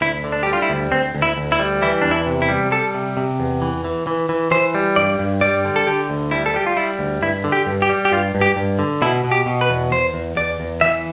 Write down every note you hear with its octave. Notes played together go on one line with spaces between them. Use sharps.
D2 E4
D3
D4
G3 G4
F4
E4
D2
D2 C4
D2
E4
D2
E4
G3
E3 E4
E2 D4
E4
C3
E4
G3
G3 A4
C3
C3
E2
E3
E3
E3
E3
E3 C5
G3
G2 D5
G2
G3 D5
D3
A4
D3 G4
D2
G3 E4
A4
G3 G4
F4
G3 E4
D2
G2 E4
D3
G4
G2
G4
G3
G4
G2 F4
G2
G4
G2
D3
B2 E4
B2
G4
B2
B4
E2
E2 C5
E2
E2 D5
E2
E3 E5